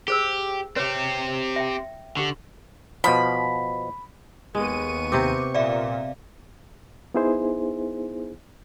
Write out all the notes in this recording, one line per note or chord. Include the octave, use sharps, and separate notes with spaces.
G4 G#4 C5 E6
C4 G4 B4 C#5
E5 G5
D3 G4 C#6
B2 F3 B5
D#2 G#3 B3 C#6 D#7
C3 C4 D6
A#2 D5 E5 F5
B3 D#4 E4 G#4 C5